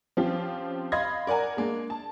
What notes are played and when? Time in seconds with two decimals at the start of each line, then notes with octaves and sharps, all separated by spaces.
0.17 F3 C4 C#4 F4 G4
0.92 D#5 F5 B5 C6 G#6 A#6
1.27 A#4 D5 F#5 G#5 A#5
1.57 G#3 A#3 D4
1.90 A5